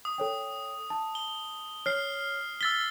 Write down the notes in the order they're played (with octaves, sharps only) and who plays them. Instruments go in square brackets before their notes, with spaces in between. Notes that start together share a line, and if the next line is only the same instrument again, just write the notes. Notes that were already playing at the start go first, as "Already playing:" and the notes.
[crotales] D#6
[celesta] A4 C#5 G5
A5
[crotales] G7
[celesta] C#5 [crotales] F6 C7
[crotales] E6 A6 G7 [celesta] B6